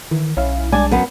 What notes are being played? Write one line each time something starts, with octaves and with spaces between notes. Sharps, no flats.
D#3 E3
B1 C#4 E4 F5
G3 G#3 D4 D5 G#5
F#2 B3